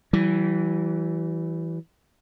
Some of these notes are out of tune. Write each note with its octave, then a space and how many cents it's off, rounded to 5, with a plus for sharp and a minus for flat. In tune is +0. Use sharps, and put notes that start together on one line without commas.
E3 +0 G3 -45